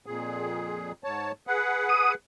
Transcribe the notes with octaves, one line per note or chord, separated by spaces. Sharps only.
F2 A#2 G#4
G#2 C#5 A5
G#4 B4 F#5
D#6